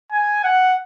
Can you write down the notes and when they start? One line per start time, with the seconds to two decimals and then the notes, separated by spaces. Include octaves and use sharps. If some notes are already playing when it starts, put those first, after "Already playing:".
0.12 G#5
0.44 F#5